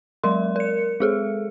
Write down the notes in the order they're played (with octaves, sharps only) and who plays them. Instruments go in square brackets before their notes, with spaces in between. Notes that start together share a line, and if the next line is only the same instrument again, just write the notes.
[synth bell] F#3 G#3 A#4 C6
A#4 C#7
G#3 G#4 A4